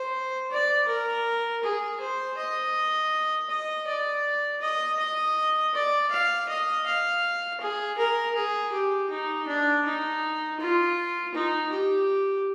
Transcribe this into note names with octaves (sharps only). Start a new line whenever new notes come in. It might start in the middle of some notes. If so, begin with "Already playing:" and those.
Already playing: C5
D5
A#4
G#4
C5
D#5
D#5
D5
D#5
D#5
D5
F5
D#5
F5
G#4
A#4
G#4
G4
D#4
D4
D#4
F4
D#4
G4